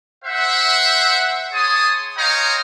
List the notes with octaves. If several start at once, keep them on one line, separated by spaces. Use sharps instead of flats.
C5 E5 F#5
G#4 C#5 A5 C6 D#6
C5 C#5 D#5 F5 G5 A#5